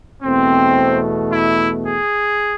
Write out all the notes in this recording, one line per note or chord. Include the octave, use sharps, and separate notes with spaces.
E2 B2 A3 C4
E4
G#4